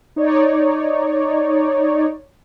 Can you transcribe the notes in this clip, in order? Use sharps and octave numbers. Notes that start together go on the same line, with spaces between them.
D#4 C#5 D5